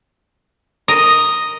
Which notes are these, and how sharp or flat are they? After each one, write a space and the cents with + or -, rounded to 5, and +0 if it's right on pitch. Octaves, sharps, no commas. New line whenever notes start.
A#4 +0 D#5 +0